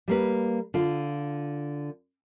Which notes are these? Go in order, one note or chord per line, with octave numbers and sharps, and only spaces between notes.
G3 A#3 B4
D3 F4